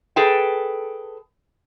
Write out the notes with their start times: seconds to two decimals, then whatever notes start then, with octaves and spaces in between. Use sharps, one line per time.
0.16 G#4 A4 B4 G5